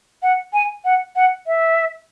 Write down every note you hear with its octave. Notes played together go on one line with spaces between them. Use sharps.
F#5
G#5
F#5
F#5
E5